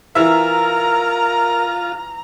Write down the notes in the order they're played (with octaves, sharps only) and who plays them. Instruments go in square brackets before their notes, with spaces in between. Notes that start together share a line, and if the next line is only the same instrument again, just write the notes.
[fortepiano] E3 E5 [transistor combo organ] F4 [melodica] A#4 [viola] A#5